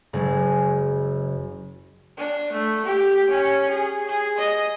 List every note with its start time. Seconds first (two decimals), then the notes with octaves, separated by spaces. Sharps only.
0.13 F#1 G#3
2.17 D4
2.52 A3
2.85 G4
3.30 C#4
3.69 G#4
4.07 G#4
4.37 D#5